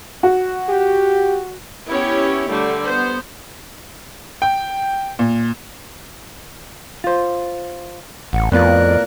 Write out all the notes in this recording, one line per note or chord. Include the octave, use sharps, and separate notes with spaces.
F#4
G4
B3 C#4 E4 G4 C#5
D3 G3 A3
B3 C5
G5
A#2
F4 C5
A1 F#5
F2 A2 B3 F4 A#4 D5 F#6